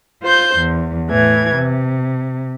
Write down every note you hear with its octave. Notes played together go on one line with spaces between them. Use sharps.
F4 C5 C6 G6
E2
A2 E3 G#6
C3